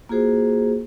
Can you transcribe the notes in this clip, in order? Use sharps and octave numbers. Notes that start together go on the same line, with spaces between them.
A#3 F4 F#4 G#4 C5